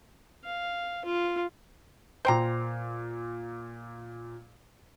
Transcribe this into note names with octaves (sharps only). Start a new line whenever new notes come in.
F5
F4
A#2 C5 G5 A#5 C7